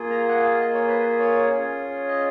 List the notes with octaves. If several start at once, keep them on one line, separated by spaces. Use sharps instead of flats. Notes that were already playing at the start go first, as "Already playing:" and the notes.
Already playing: A#3 F4 G#4
A#5
F#5
F5
D#5
C#5
B4
C#5
C#4 F4 G#4
D#5